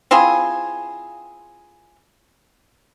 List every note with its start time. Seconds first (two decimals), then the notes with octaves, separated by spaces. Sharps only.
0.11 C4 E4 F4 G#4